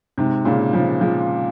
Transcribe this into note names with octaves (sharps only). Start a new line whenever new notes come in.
G#2 C3
A#2 C#3
C#3 F3
F3 G#3